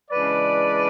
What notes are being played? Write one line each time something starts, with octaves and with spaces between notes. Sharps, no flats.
C#3 E3 G#3 D4 B4 D5